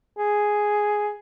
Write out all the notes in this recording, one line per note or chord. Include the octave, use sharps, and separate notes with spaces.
G#4